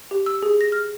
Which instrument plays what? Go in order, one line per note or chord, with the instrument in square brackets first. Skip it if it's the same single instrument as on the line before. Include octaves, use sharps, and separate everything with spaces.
[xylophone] G4
E6
G#4
A#6
F6